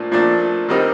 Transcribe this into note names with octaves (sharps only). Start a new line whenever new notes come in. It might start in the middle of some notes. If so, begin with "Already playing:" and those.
Already playing: A#2 F3 A3 D4
A#2 F3 A3 D4
D#3 G3 C4 D#4